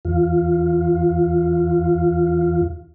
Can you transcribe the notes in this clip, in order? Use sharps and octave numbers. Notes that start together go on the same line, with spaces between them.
E2 F4